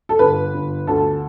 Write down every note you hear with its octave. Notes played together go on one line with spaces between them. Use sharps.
A4
G1 B4
G1
D2 A4